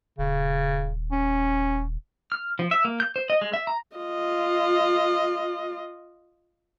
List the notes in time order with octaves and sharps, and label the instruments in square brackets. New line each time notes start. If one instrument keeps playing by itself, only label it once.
[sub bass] D#1 [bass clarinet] C#3
[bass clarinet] C#4
[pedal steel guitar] F6
F3
E5
A#3
G6
C5
D#5
G#3
E5
A#5
[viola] F4 D#5